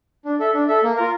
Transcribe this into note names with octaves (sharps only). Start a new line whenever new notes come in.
D4
A4 E5
D4
A4 E5
A#3
F4 A#4